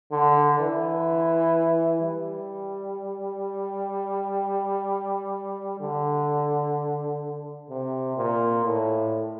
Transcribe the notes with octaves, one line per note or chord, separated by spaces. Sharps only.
D3
E3
G3
D3
C3
A#2
A2